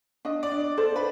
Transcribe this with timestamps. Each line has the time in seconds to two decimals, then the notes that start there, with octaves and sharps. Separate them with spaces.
0.25 D4 D#5
0.43 D5
0.51 D4
0.78 A4 C5
0.96 B4